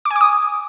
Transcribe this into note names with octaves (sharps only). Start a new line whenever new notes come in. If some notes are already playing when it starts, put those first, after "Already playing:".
D6
G#5
D6
D#6